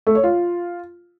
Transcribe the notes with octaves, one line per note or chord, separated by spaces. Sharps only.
A3
C#5
F4